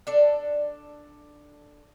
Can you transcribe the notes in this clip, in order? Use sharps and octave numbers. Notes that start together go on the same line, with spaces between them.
D4 A4 D5